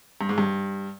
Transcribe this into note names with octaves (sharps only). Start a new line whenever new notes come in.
G2
G#2
G2